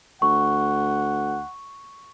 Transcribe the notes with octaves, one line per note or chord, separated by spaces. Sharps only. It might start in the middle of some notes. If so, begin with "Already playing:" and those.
D2 F#5 C#6